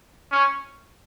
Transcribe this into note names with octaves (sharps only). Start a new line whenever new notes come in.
C#4